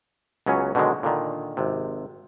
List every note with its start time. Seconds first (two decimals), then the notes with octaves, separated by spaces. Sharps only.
0.46 C#2 F#3 B3 C#4
0.75 B2 D3 D#3 F#3 G#3
1.03 A#2 D3 D#3
1.57 G#1 C3